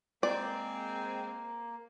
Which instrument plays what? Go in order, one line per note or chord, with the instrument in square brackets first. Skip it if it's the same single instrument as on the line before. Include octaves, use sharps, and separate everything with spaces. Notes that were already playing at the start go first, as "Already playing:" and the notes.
[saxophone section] G#3 C4 [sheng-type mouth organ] A#3 [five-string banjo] D5